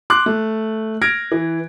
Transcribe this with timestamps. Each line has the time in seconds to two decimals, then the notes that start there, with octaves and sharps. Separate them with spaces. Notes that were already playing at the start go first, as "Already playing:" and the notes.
0.10 C6 D6 F#6
0.26 A3
1.02 F6 G#6 A#6 D7
1.32 E3